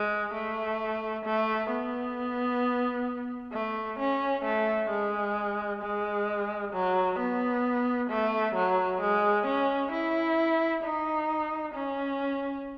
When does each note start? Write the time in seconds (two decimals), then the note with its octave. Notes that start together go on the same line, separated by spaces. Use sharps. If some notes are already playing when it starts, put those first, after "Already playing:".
Already playing: G#3
0.34 A3
1.25 A3
1.70 B3
3.52 A3
3.99 C#4
4.44 A3
4.90 G#3
5.81 G#3
6.73 F#3
7.19 B3
8.10 A3
8.55 F#3
9.01 G#3
9.46 C#4
9.91 E4
10.83 D#4
11.74 C#4